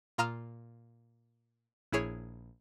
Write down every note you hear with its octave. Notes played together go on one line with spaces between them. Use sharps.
A#2 F4 A#5 D#6 F6 E7
A#1 E4 G#4 C#5